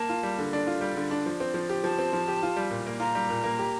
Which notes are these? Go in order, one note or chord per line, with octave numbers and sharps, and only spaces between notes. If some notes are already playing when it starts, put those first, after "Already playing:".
Already playing: A#3 A5
F4
G3
D3
D4
F4
G3
D3
D4
F3
C4
F3
G4
F3 A5
C4
F3
G4
F4
G3
A#2
A#3
F4 A#5
G3
A#2
A#3
G4